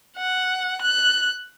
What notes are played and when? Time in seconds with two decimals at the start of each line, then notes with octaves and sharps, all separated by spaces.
0.17 F#5
0.82 F#6